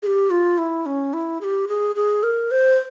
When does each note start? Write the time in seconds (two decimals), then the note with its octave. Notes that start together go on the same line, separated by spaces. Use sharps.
0.03 G#4
0.07 G4
0.30 F4
0.58 E4
0.86 C#4
1.13 E4
1.41 G#4
1.44 G4
1.68 G#4
1.96 G#4
2.23 A#4
2.51 C5